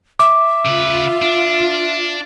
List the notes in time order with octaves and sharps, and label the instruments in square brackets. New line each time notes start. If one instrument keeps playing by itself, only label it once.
[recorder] E5 [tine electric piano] D6
[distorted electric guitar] C#3 B4 [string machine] F4
[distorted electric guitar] D4